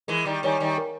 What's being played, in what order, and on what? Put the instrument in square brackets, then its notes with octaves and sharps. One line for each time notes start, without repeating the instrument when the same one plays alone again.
[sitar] E3 G#3 [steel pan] A#4
[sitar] D#3 G3
[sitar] D#3 G3 [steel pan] C#5 G#5
[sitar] D#3 G3
[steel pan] A#4